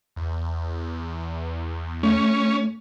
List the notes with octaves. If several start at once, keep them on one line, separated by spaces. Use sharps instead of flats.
E2
A3 C#4